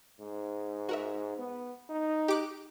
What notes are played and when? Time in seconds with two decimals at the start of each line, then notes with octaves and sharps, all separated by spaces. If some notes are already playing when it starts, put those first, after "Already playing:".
0.20 G#2
0.89 F#4 A#4 E5
1.38 B3
1.89 D#4
2.28 G4 D6 F#6